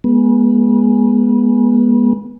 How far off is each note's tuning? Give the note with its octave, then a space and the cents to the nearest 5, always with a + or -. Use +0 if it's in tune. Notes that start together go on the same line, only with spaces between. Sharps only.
G#3 +0 B3 -30